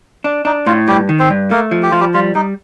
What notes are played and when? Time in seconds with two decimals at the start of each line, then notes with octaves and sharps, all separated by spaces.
0.24 D4
0.45 D4 D#4
0.66 A2 F4
0.88 G2 G3 G4
1.09 D#3
1.19 C4 C5
1.30 G2
1.51 A3 A#3 A#4
1.71 F3
1.83 G4
1.91 F3 F4
2.00 G3 G4
2.14 G3 F4
2.35 G3 D#4